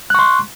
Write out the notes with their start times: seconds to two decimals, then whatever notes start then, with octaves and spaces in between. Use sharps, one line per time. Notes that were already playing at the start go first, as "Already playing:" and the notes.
0.10 F#6
0.15 C#6
0.19 C6